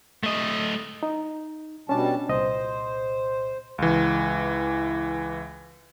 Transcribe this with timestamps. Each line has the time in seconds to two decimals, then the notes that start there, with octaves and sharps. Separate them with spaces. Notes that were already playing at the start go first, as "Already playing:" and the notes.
0.23 A3 D#5
1.03 D#4
1.89 B2 G3 C#4 D4 A5
2.29 C2 A#2 C5 D#5
3.78 C#2 E3